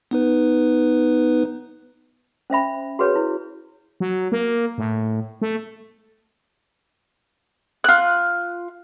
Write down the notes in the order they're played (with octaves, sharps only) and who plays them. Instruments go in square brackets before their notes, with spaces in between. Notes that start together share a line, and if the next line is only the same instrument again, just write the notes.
[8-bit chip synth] B3 D#4 B4
[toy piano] C#4 C5 E5 B5
F#4 G#4 B4 C#5
E4
[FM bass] F#3
A#3
A2
A3
[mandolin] F4 F#6